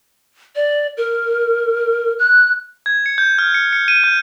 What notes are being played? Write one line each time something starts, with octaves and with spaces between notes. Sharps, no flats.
D5
A#4
F#6
G#6
C#7
G6
F6
C#7
C#7
D#7
G6